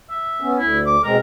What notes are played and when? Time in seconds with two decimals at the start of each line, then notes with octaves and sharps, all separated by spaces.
0.10 E5
0.40 B3 C#4
0.58 D2 E4
0.86 D6
1.03 B2 G#3 C4 A#4